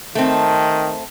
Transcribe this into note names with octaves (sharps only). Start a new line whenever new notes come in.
D#3 A3 C4